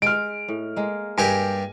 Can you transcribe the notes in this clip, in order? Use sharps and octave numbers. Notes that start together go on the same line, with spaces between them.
G#3 F6 D7
A2
G#3 A#3
G2 G4 A#4 G#5